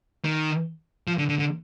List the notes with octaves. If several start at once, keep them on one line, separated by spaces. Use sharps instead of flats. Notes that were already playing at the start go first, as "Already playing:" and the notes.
D#3
F3
D3
D3
D3